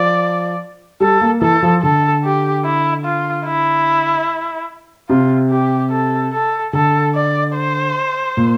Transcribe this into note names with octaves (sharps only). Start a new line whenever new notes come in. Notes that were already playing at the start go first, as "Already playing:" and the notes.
Already playing: F3 D5
G3 A4
A#3
E3 A4
F3
D3 A4
G4
E4
F4
E4
C3 F4
G4
A4
A4
D3 A4
D5
C5
A#2